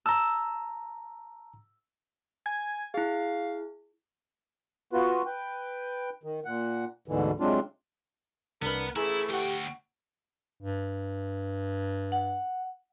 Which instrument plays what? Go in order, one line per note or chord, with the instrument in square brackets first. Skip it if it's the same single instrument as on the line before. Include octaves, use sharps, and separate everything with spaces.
[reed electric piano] A5 A#5 [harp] E6
[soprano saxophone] G#5 [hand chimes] G#6
[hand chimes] E4 G#4 [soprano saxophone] F5
[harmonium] B3 F4 F#4 B4
B4 G5
D#3
A#2 F#5
D2 G#2 B2 D3 E3
C3 F#3 G#3 C4 D4 F4
[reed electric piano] C2 B4 [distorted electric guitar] B3 [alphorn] D4 [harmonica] A#4
[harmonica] E3 A3 [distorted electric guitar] E4 [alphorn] G#4 [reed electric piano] G#5 A#5
[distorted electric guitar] D2 G5 [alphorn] G4 [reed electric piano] F#5 C#6
[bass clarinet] G2
[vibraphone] F#5